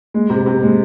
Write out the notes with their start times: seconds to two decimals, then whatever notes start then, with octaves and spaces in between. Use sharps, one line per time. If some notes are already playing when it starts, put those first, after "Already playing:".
0.14 G#3
0.30 C3
0.46 C3
0.62 G#3